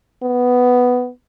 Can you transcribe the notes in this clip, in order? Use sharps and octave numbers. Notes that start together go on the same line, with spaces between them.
B3